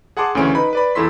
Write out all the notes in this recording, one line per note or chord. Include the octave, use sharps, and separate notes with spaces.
G#4 F#5 A5 C6 D6
D2 C#3 E3 C#4 D7
D#4 B4 B5
B4 D5 B5
E2 E4 A4 C6 B6